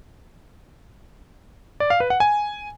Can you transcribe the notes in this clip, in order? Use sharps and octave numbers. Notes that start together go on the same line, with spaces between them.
D5
F5
B4
F#5
G#5